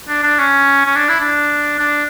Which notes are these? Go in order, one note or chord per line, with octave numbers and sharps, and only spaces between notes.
D4
D4
C#4
C#4
D4
E4
D4
D4